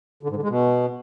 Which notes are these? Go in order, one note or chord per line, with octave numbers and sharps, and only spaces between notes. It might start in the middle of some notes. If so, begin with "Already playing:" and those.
D3
G#2
D3
G#3
B2